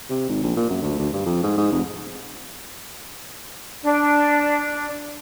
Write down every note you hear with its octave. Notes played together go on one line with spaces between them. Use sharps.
C3
G#1
A#1
A#2
F#2
D2
D2
G2
F2
G#2
G#2
F1
D4